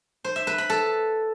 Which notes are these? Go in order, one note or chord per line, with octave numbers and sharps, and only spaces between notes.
C5
E5
B4
B5
A4